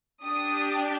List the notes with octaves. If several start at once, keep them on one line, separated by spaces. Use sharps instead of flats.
D4 G4 D#6